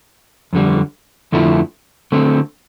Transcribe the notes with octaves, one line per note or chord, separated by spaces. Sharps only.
F2 D3 G3
F2 D3 F3 A3 E4
D3 A3 C4